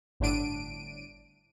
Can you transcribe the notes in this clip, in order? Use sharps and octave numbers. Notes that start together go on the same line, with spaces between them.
G1 A2 D3 D4 D7 D#7